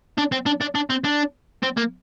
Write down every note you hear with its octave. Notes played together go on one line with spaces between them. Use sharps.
D4
C4
D4
D4
D4
C4
D4
C4
A#3